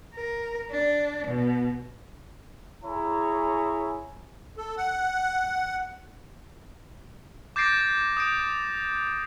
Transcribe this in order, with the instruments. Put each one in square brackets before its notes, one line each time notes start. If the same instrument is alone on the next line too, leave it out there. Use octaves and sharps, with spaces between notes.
[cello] A#4
D4
B2
[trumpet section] E4 G#4 C#5 A#5
[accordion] A4
F#5
[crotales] D6 G6 A6 A#6 C7 D7
G6
D#6 G6 D7